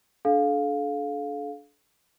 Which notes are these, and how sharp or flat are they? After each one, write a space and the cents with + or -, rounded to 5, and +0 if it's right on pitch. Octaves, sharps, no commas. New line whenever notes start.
D4 -15 A4 -40 F5 +15